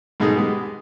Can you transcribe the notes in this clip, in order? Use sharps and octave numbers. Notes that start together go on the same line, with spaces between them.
G#2 B2 D#4 G#4 A4 D#6
G#3 B3 G4